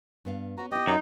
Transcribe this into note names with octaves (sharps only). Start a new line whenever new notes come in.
G2 B3 F5
B3 C#4 F#4 A#5
B3 E4 G4 D#5
F#2 F#3 D#4